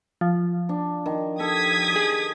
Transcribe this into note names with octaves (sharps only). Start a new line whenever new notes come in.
F3
D4
D#3
G4 A4 D#6 G#6 B6
G#4